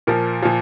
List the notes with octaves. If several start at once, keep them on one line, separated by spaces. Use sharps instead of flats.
A#2 F3 A#4
A#2 F3